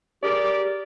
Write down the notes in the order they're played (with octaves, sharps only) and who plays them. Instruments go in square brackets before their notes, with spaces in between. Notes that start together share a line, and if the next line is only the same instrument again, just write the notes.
[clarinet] G4 [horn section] G#4 A#4 D5